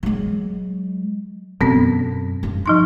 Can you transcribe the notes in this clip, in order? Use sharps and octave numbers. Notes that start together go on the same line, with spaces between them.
F#3 G#3
F#2 B2 B3 C4
G2
F3 D#4 C6